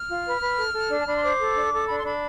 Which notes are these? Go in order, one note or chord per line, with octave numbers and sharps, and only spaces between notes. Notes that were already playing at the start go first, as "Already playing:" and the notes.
Already playing: F6
F4
B4
B4
A4
A4
D4
A5
D4 B5
C6
C5 D6
A4
D4
A4
D4 B5
C6
D4 B5